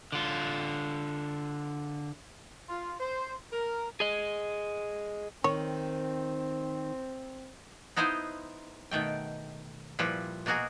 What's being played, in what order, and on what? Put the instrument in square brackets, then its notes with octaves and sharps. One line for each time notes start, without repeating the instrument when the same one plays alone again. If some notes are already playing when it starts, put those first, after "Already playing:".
[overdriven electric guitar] D3 F4
[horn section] F4
C5
A#4
[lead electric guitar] G#4 D#5
[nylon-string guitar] D#3 [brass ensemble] C4 [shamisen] C#5
[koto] B3 D#4 E4 C5 D#5 F5
B2 D#3 A3 G5
A#2 F3 G3 E4 B4
B2 A#3 F#4 G#4 A#4